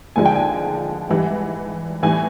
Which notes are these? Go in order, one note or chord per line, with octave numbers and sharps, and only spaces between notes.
D#2 D3 F3 G#3 G#5
G5
G#5
G#2 E3 G3
A2 E3 G3 G#5